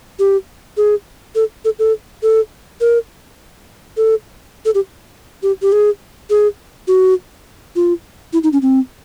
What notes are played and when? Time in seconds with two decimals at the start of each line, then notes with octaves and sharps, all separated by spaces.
0.19 G4
0.77 G#4
1.35 A4
1.65 A4
1.79 A4
2.23 A4
2.81 A#4
3.97 A4
4.65 A4
4.75 G4
5.43 G4
5.62 G4
5.72 G#4
6.30 G#4
6.88 F#4
7.76 F4
8.33 E4
8.44 D#4
8.53 C#4
8.62 C4